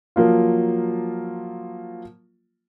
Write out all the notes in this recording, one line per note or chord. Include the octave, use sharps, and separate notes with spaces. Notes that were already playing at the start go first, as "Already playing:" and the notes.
F3 F#3 A#3 F4